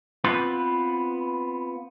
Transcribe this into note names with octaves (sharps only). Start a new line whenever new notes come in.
B3 C4 F4 B4